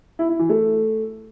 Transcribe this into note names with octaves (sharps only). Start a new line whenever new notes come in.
E4
E4
E3
A3